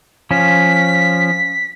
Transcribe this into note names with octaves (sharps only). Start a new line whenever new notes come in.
F3 C#4 B6